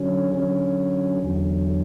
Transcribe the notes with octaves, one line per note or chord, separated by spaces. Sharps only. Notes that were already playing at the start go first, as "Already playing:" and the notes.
Already playing: D3 F#3 C#4
D3 F#3 C#4
E2 D3 F#3